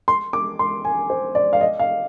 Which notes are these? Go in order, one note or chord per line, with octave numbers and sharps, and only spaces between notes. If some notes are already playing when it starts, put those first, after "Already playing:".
C6
D6
C6
G#5
C5
D5
F5
D#5
F5